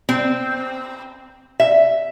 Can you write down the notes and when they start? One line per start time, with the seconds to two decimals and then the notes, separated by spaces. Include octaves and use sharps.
0.09 C4
1.60 E5